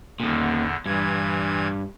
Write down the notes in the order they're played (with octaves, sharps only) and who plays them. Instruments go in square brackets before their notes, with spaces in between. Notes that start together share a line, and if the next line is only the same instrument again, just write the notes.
[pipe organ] E2 D3 [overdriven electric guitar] A#2 D#3
[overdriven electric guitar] G2 [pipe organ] A#2 E3 G#6